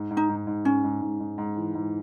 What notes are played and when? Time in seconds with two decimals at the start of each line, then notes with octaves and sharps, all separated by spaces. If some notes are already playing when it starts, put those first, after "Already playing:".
Already playing: G#2
0.11 G#2
0.17 D#4
0.29 G#2
0.47 G#2
0.65 G#2 C#4
0.84 G#2
1.01 G#2
1.20 G#2
1.38 G#2
1.57 E3
1.75 G#2